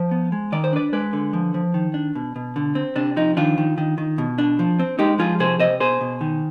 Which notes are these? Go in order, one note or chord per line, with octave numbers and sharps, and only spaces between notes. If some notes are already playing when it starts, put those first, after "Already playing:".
Already playing: F3 C5
B3
G#3
D#3 D5
C5
D4 B4 D5
G#3 B4 D5
D3
F3
F3
D#3
D4
B2
B2
D3
C4
C3 D4
F3 D#4
D#3 D4 F4
D#3
D#3
D#3
B2
D4
F3
C4
G#3 D#4 G4
F3 F4 G#4
C3 G#4 C5
C3 C5 D#5
B2 G#4 C5
B2
D#3